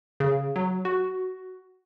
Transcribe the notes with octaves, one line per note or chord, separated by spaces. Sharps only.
C#3
F#3
F#4